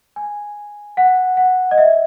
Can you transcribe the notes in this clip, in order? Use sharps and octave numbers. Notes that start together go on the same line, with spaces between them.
G#5
F#5
F#5
D#5
E5